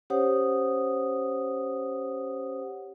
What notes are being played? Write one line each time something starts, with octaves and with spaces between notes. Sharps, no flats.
C#4 G4 C5 C#5 F#5 D#6